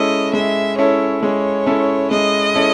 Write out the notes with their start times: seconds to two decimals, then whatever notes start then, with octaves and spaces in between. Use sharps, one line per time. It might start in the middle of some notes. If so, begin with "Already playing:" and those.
Already playing: G#3 C#4 E4 A4 D#5
0.33 G#3 E5
0.78 C#4 E4 A4 C#5
1.22 G#3 C#5
1.66 C#4 E4 A4
2.11 G#3 D#5
2.55 C#4 E4 A4